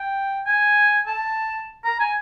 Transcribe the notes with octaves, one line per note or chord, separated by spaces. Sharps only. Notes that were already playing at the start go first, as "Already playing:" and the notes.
Already playing: G5
G#5
A5
A#5
G#5